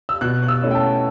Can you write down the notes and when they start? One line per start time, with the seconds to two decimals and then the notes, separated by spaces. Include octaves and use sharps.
0.09 E6
0.21 B2 F#6
0.43 F#6
0.48 E6
0.62 A3 C#4 E4
0.71 G5
0.75 A5